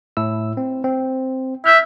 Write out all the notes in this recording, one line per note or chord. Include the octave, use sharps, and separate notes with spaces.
A2 E4 E6
C4
C4
E5 F6 G6